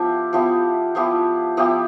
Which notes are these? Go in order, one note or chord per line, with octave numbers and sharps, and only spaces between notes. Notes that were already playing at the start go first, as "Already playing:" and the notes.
Already playing: F3 B3 E4 G4
F3 B3 E4 G4
F3 B3 E4 G4
F3 B3 E4 G4